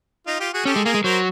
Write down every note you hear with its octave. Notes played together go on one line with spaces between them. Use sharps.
D#4 F4
F4 G4
F#4 G#4
C#4 G4 A4
G#3
A#3 G#4 A#4
G#3
F#3 A#4 C5